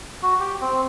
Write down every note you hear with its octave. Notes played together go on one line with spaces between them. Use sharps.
F#4
G4
C4